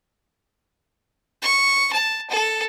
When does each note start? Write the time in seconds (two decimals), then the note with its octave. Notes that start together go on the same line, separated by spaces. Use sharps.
1.42 C#6
1.92 A5
2.30 A4